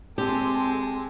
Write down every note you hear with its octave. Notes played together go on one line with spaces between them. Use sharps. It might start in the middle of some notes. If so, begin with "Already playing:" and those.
G#3 C4 G4 A4